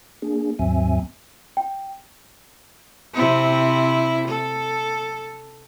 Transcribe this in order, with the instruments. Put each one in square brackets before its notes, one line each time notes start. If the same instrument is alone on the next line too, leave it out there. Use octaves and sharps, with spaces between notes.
[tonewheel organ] A#3 D4 G#4
D#2 G#2 F#3 C4 E5 G#5
[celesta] G5
[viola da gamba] C3 C4 E4
A4